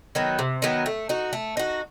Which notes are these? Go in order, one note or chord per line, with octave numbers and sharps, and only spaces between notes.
D#3 F#3 B3
C3
D#3 F#3 B3
A3
D#4 F#4
A3
D#4 F#4